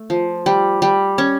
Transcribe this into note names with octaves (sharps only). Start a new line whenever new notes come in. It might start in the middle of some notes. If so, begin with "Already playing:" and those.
Already playing: A3
F3
G3
G3
C#4